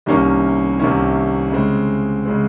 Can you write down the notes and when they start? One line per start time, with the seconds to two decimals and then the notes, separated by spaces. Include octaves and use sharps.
0.06 C2 C3 D#3 A#3 C#4
0.79 C2 C3 D#3 A#3 C#4
1.52 C#3 G#3 C4
2.25 C#3 G#3 C4